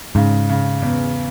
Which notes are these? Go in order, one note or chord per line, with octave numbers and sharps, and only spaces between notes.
G#2 C#3
C#3
E2